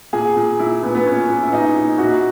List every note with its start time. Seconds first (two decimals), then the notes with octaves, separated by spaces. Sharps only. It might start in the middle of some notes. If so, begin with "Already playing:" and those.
0.13 A#2 G#4
0.36 A#2
0.59 A#2 E4
0.83 A#2 B3
0.95 B3
1.06 A#2 C#4
1.29 A#2
1.42 E4
1.53 A#2 D#4
1.76 A#2
1.98 A#2 F#4